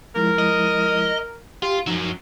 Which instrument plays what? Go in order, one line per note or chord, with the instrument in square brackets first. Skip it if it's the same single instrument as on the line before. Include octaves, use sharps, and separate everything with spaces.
[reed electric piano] F3 G#3 E4 [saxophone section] A#4
[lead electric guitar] D#5
[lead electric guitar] F4 [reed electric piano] G4
[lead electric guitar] F#2 F#3 [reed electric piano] F3 D#4